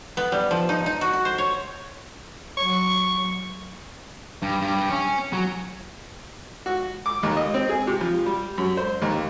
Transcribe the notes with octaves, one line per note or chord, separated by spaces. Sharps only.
B3
G3
F3
D#4
D#4
F#4
F#4
C5
C#5
F#3 C#6
G2
G2
C#4
F#3
F#4
D6
D#2
D#5
C4
G#4
C3
F3
G3
F#2
C5
D#2